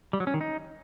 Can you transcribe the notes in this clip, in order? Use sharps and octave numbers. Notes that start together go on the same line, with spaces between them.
G3
F#3
C#4
D#3
D#4